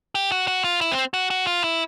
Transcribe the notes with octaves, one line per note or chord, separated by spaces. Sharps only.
G4
F#4
F#4
F4
E4
C4
F#4
F#4
F4
E4